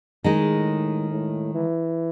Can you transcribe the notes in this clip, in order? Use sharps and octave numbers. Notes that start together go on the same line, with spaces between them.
A2 D#3 G#3 D#4
A2
E3